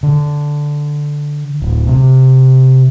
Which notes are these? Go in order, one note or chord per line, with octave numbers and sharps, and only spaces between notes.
D3
D1
C3